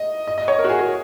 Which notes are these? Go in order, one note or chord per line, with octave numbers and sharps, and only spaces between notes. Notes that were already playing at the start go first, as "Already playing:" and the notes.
Already playing: D#5
D#5
D#5
C#5
A#4
F#4
G#4
F#4